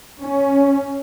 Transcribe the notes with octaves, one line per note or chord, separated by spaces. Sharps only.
C#4